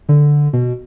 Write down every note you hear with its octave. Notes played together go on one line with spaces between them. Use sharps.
D3
B2